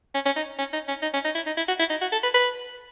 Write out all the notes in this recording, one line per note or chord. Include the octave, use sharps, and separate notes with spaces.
C#4
C#4
D#4
C#4
D#4
C#4
D#4
C#4
D#4
E4
D#4
E4
F#4
E4
D#4
F#4
A4
B4
B4